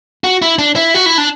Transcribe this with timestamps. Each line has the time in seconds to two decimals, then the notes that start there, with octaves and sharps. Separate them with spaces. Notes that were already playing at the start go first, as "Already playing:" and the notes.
0.24 F#4
0.42 E4
0.58 D4
0.76 E4
0.94 F#4
1.06 E4
1.18 D4